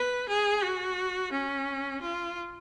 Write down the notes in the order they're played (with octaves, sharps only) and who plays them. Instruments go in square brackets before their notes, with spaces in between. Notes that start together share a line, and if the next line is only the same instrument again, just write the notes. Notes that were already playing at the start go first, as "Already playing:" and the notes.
Already playing: [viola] B4
G#4
F#4
C#4
F4